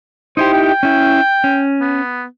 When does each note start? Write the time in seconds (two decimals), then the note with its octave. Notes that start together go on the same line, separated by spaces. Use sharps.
0.37 D#4 E4 G4 C5
0.53 G5
0.83 C#4 E4
1.44 C#4
1.80 B3